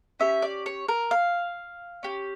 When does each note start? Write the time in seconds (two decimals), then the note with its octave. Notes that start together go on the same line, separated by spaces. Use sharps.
0.20 C#4 G4 E5
0.42 D5
0.66 C#5
0.88 A#4
1.11 F5
2.03 C#4 G4